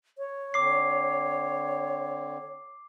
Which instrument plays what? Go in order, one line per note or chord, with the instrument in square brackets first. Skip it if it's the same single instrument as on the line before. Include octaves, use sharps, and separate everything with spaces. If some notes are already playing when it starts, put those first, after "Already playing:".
[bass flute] C#5
[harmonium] D3 C4 [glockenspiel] D6 C7